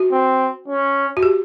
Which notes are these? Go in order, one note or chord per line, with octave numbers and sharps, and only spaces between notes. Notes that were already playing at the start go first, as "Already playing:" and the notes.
Already playing: F#4
C4
C#4
F#4
G4